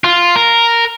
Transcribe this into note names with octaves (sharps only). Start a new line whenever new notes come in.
F4
A#4